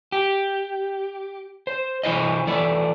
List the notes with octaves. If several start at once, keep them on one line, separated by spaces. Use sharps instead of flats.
G4
C5
E3 E4 C5 D#5
E3 F3 A3 D5